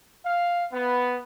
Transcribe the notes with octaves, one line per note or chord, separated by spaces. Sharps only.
F5
B3